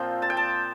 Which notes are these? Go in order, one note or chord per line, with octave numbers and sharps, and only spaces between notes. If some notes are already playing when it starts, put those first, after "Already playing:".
Already playing: A#2 F3 C4 G5
A5
G5
A5